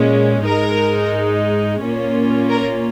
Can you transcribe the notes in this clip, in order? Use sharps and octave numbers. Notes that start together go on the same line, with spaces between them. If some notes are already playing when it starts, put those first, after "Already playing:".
Already playing: A#2 G#3 C#4
G#2 G#3 D#4 A#4
A#2 A#3 C#4 F4
A#4